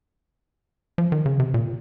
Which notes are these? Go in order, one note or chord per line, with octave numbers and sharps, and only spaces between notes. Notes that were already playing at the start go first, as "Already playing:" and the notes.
F3
D#3
C#3
C3
A#2